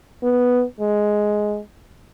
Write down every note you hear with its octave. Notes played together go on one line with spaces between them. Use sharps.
B3
G#3